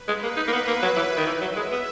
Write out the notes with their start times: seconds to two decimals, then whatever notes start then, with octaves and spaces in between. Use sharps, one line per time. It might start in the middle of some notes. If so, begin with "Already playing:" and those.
Already playing: B4
0.08 G#3
0.23 A#3
0.37 D#4
0.48 A#3
0.53 B3
0.68 A#3
0.83 F#3
0.96 E3
1.11 C#5
1.17 D#3
1.26 E3
1.41 F#3 E5
1.56 G#3
1.71 B3